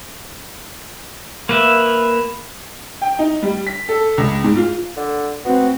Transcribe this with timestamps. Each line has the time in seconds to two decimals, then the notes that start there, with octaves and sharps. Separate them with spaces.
1.49 A#3 B4 E5
3.02 G5
3.19 D#4
3.42 G3
3.67 B6
3.89 A4
4.18 C#2
4.44 G#2
4.57 F4
4.97 D3
5.45 A3 B3 C4 F#4